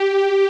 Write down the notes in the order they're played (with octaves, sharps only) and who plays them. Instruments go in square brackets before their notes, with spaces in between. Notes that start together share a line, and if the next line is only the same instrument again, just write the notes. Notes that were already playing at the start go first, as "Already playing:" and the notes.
Already playing: [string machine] G4